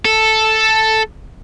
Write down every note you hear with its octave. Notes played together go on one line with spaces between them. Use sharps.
A4